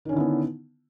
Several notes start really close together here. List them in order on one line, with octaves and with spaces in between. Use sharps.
D#3 C#4 D3 E4 B3